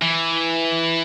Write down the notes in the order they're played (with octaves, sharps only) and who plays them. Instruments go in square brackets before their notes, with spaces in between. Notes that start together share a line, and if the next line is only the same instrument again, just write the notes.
[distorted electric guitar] E3